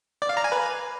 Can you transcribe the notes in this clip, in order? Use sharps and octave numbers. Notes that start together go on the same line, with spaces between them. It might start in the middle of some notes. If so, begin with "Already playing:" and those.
D5
F5
A#5
G#5
B4